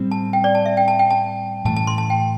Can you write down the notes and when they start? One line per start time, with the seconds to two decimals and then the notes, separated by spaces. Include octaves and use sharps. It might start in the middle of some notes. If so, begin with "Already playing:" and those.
Already playing: A2 G3 C4
0.11 A5
0.33 G5
0.44 D5
0.55 A5
0.66 E5
0.77 G5
0.88 A5
0.99 G5
1.10 A5
1.65 A2 E3 A3 A5
1.76 A5
1.87 C6
1.98 A5
2.10 G5